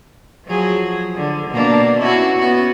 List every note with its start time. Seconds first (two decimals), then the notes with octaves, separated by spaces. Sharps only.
0.46 F3 F#3 G#4
1.17 D3
1.50 B2 A#3 D4
2.00 C#4 E4 F#4
2.37 B3 C#4 F#4